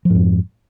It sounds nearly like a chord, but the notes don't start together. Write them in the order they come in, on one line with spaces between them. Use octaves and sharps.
F3 G#2 F2